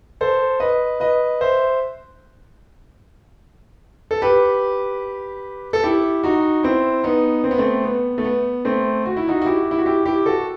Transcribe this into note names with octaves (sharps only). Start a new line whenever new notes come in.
A4 C5
B4 D#5
B4 D#5
C5 E5
A4
G4 B4
A4
E4 G4
D#4 F#4
C4 E4
B3 D#4
C4
B3
A3 C4
B3
A3
B3
A3 C4
F#4
E4
D#4 F#4
F#4
E4 G4
E4
F#4
E4 G4
E4 G4
F#4 A4